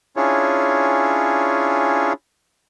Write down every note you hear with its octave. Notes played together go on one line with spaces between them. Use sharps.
C#4 D4 E4 F4 G#4 C#5